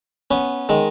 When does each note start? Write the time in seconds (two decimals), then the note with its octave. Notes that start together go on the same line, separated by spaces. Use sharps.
0.31 B3 C#4
0.69 D#3 G#3